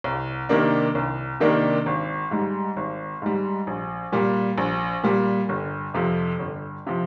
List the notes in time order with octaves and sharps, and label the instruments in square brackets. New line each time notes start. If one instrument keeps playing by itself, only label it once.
[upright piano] C2
C3 D#3 A#3 D4
C2
C3 D#3 A#3 D4
G#1
G#2 G3
G#1
G#2 G3
A#1
A#2 G3
A#1
A#2 G3
G1
F2 C3 F3
G1
C3 F3